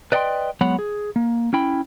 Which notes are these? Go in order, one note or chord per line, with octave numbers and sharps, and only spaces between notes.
B4 D5 D#5 F#5 G5 C6
F#3 G#3 B3 C#5 F#5 B5
G#4
A#3
C#4 E4 G5 B5